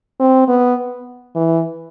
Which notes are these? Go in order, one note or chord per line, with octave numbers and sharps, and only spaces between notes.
C4
B3
E3